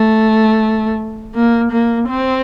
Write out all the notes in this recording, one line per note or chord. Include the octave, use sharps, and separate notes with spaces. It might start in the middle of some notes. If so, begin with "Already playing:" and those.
Already playing: A3
A#3
A#3
C4